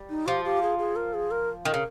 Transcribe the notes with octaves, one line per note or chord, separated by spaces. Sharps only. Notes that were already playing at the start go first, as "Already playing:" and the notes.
Already playing: G3
D#4
F3 G4
G4
G#4
G#4
A#4
G#4
A#4
D#3 A#4
C#3